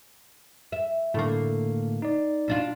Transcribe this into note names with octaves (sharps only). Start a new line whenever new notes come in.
E5
A2 D3 A3 A#3
D#4 D5
B2 D4 F4